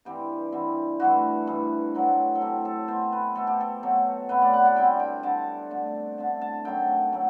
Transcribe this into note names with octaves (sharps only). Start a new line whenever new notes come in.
G2 E3 G3 C4 G4
G2 E3 G3 C4
G2 E3 A3 F#4
G2 E3 A3
A2 F#3 C4
A4
A2 F#3 C4 G4
A4
B2 A3 C4 C5
B4
B2 A3 C4 A4
G4
A4
B2 F#3 A3 C4
B2 F#3 A3 C4 B4
D5
F#5
F#5
D3 G3 C4 G5
G5
D3 G3 C4 A5
D3 A3 D4
D3 A3 D4 A5
A5
F#2 F#3 A3 G5
F#3 A3